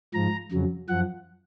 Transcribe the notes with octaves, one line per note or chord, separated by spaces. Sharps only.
G#2 F3 A#5
F2 C#3 F#3
F#2 F3 F#5